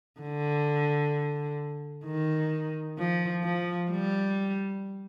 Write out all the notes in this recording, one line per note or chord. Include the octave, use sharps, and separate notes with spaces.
D3
D#3
F3
F3
G3